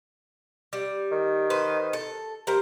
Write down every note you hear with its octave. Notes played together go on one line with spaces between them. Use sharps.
G3
D#3
B4 C5
A4
G3 A#4 C5